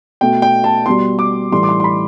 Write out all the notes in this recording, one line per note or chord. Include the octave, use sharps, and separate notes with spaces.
B2 A3 G5
G5
A5
B2 G3 C6
D6
A2 E3 G3 C6
D6
C6
C6
B5